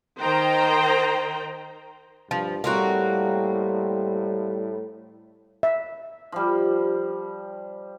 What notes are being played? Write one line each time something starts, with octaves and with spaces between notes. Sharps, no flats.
D#3 C5 G5 A#5
G2 F3
A2 G3 A#3 C4 F#4
E5
F3 G3